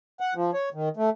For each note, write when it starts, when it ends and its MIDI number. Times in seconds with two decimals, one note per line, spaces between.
0.20 0.34 78
0.35 0.51 53
0.54 0.69 73
0.74 0.89 51
0.97 1.10 57